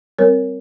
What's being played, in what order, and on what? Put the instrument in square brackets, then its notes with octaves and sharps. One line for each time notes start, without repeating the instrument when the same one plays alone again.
[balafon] G3 C4 A#4 C#5